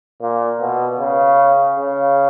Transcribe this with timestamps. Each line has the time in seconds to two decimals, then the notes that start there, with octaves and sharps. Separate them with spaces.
0.22 A#2
0.61 B2
1.00 C#3
1.79 C#3